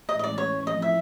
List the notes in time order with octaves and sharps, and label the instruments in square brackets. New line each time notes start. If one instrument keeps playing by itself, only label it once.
[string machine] A2 E3 G#3 C#4 [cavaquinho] D#5
[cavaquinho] D#5
D5
C#5
[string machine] F3 A3 C4 E4 [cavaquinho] D#5
[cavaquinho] E5